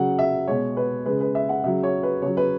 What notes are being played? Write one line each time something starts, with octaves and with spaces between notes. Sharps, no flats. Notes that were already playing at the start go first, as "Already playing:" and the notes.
Already playing: C#3 F#3 F#5
E5
B2 G#3 C#5
B4
C#3 G#3 B4
B4
E5
F#5
C#3 F#3 E5
C#5
B4
C#3 F#3 C#5
B4